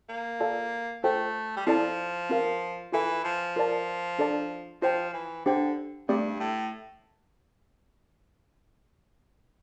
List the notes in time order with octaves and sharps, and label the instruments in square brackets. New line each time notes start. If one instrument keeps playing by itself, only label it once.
[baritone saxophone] A#3
[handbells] F4 A4 D5 F5 A5
[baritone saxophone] A3 [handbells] F4 A4 C5 G5
[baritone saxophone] G3
[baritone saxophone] F3 [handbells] C4 E4 A4 D5 A5
[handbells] C4 F4 A#4 F5
[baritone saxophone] E3 [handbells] F4 A4 E5 A5
[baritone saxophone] F3
[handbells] F4 A#4 D5 A5
D4 A4 D5 A5
[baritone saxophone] F3 [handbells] F4 C5 G5
[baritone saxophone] E3
[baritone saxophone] D3 [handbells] D4 G4 C5 G5
[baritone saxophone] G2 [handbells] A3 C4 G4 D5
[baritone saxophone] A2